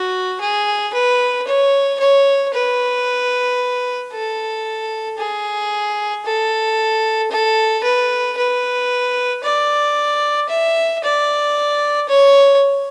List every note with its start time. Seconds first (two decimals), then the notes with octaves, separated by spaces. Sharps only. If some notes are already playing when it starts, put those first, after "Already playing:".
Already playing: F#4
0.41 G#4
0.93 B4
1.47 C#5
2.00 C#5
2.53 B4
4.13 A4
5.18 G#4
6.26 A4
7.31 A4
7.84 B4
8.37 B4
9.44 D5
10.50 E5
11.04 D5
12.09 C#5